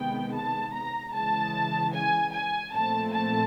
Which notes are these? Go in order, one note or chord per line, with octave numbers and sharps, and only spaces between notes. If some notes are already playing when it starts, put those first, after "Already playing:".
Already playing: C3 D#3 G#3 B3 G5
A5
A#5
C#3 E3 G#3 A5
G#5
G#5
A#2 F3 A3 C4 A5
A5